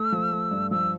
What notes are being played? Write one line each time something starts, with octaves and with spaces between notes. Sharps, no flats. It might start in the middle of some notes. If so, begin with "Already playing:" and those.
Already playing: A3 E6
F3
A3
G2
F3 E6